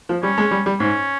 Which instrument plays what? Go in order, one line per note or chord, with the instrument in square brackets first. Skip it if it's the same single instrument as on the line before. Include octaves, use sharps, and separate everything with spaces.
[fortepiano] F3
[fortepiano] G3 [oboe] C#4
[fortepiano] G#3
G3
G3
[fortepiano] G#2 [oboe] C#4